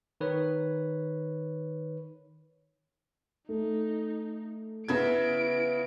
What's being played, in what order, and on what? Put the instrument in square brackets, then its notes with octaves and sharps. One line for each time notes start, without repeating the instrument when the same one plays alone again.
[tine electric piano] D#3 B4 C#5
[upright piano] A3 [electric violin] D#4
[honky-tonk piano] C#3 G#6 [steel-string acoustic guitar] B3 E5 [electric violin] E4 D7 [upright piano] B4